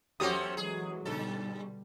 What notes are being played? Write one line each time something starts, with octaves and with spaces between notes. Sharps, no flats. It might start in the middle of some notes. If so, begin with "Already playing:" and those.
E2 F#3 A3 C4 C#4 F#4 G4 D#6
E3 F#3 G#3 G#4
G2 B2 D3 G3 A4